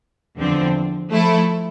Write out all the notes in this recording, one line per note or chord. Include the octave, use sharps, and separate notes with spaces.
E2 D3 F3 C4
F3 A3 E4 A4